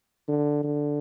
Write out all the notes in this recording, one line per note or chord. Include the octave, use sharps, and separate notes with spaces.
D3
D3